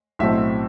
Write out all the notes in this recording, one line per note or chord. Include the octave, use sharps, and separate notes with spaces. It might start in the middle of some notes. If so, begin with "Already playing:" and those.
B1 A2 F#3 A3 C4 E5